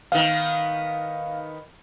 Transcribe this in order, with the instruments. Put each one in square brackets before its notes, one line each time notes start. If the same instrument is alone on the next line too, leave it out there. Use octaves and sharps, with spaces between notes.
[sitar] D#3 B3 [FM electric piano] F5